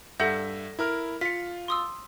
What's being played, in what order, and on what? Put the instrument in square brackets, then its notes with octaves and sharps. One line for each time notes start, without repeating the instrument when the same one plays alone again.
[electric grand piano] G2 E5 A#6 [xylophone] A4 F#5 G6
[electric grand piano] E4 A#4 F6
[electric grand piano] F4 F5 [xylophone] B6 C#7
[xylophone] C6 D#6 E6